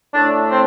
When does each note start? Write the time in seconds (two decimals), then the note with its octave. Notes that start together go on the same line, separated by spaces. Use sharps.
0.14 A2 A3 D4
0.50 C4